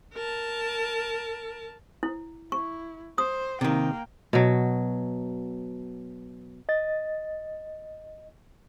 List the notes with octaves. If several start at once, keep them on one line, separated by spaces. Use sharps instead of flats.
A#4 A5
E4
E4 C#6
C5 D#6
C3 D#3 A#3 G5
B2 F#3
D#5 A6